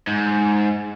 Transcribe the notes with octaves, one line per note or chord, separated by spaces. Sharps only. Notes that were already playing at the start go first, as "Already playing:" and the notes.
G#2